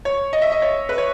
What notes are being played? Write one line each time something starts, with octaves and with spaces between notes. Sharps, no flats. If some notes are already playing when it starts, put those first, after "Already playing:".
C#5
D#5
E5
D#5
C#5
B4
C#5